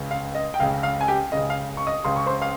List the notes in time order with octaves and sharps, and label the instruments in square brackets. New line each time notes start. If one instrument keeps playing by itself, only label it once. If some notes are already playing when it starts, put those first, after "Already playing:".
Already playing: [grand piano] C#2 C#3
F5
D#5
G5
C#2 C#3 F5
F5
G#5
G4 G5
C#2 C#3 D#5
F5
C#6
D#5 D#6
C#2 C#3 C6
C#6
C5 C6
F5